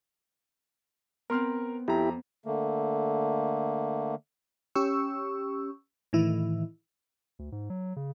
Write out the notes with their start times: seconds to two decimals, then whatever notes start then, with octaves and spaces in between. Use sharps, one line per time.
1.30 B3 C4 A#4 C6 F6
1.88 F2 E4 G4 A#5
2.46 D3 A3 A#3
4.75 C#4 G4 C#6 E6
6.13 A2 D#3 E3 E4
7.39 D2
7.52 G#2
7.70 F#3
7.96 C#3